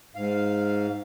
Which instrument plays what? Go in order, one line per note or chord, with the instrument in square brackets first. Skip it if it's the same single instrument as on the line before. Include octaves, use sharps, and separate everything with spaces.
[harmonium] G#2 F5